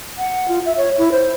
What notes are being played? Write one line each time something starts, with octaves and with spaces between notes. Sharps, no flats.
F#5
F4
E5
C#5
E4
C5